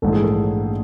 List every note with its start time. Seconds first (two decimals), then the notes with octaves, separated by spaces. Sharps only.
0.02 A#1 G#2 E3 A3 A4
0.13 G#4
0.23 A4